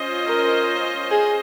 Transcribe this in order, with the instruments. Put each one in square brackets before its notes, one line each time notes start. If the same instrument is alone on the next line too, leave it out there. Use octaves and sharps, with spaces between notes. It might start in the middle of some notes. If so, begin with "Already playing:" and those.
Already playing: [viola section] C#4 F4 C5 D#5
[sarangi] A#4
G#4